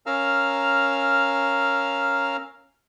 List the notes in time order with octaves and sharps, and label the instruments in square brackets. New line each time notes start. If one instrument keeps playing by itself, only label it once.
[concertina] C#4 A#4 F5 A#5 E6 F6